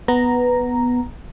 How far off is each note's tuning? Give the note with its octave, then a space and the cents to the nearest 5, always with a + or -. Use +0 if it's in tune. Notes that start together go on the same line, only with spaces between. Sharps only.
B3 +0 A#5 +0